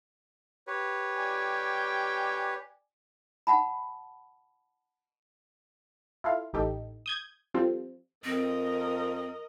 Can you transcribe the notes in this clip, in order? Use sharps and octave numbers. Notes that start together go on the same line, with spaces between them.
G4 B4 C#5
D5 G5 G#5
F#5 A5 B5
E4 F4 A4 F5
A1 D#4 G4 A4
D#6 G6 G#6
F3 G3 C4 F4 A4
F2 C4 A#4 D#5